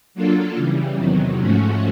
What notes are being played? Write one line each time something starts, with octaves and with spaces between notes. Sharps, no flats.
F#3 A#3 D4 F4 A4
C#3 E3 G3
E2 C3 D#3 F#3
G#2 F3 A3 C#4 F#4